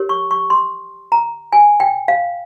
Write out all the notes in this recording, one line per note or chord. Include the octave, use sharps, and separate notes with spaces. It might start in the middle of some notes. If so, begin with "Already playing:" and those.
Already playing: G4 A#4 C#5
C#6
C#6
C6
A#5
G#5
G5
F5